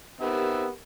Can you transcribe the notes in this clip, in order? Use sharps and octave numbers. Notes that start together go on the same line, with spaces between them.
D#3 B3 C4 G4 A#4 E5